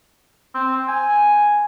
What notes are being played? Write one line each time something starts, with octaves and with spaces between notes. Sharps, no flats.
C4
G#5